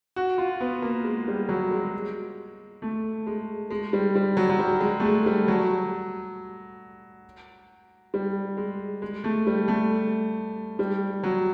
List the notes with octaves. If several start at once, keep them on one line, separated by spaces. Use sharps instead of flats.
F#4
F4
B3
A#3
G#3
G3
F#3
G#3
A3
G#3
G#3
G3
G3
F#3
F#3
G3
G#3
A3
G#3
G3
F#3
G3
G#3
G#3
A3
G3
A3
G3
F#3